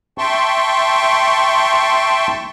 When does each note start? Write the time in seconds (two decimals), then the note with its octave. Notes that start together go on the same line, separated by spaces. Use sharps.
0.18 E5 G5 A5 C6 C#6